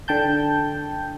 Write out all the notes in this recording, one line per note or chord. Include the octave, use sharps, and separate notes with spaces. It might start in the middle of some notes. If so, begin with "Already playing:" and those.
D3 G5 A5 G6